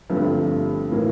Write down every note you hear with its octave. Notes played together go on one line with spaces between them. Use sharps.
G1 G2 F3 A3 C4
A2 E3 A#3